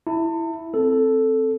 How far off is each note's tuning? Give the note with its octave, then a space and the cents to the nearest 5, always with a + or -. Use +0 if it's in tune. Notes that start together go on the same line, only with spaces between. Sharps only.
E4 +0 A5 +40
C4 +0 A4 +0